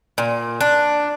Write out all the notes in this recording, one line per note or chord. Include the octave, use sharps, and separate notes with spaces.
A#2
D4